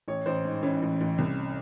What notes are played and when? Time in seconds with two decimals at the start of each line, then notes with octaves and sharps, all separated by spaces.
0.08 A1 C#5
0.26 A1 C5
0.45 G#2
0.62 E3 C#4
0.82 A1
1.00 A1
1.18 C2